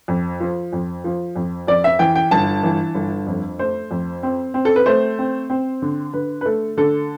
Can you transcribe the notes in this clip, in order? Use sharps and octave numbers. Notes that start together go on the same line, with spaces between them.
F2
F3
F2
F3
F2
F2 D5
E5
E3 G5
G5
G1 A5
E3
G1
F2
A3 C5
F2
C4
C4
A4
B4
A3 C5
C4
C4
D3
D3 B4
B4
A3 A4
D3 A4